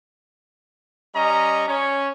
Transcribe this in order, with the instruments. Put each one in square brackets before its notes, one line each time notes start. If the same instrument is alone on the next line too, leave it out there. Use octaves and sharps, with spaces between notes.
[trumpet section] G3 C#4 D#5 A#5
C#4 C#5